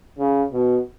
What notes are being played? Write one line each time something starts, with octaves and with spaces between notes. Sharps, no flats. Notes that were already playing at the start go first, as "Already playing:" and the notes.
C#3
B2